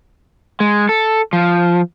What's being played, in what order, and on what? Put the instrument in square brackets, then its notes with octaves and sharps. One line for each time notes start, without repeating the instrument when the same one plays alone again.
[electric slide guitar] G#3
A4
F3